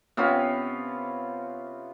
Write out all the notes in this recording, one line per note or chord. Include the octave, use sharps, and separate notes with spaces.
C3 B3 C#4 F4